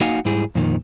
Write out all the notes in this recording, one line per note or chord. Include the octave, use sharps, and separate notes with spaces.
A#3 D#4 F#4 F5 F#5 G#5
G#2 G3 E4 G#4
F2 A#2 D#3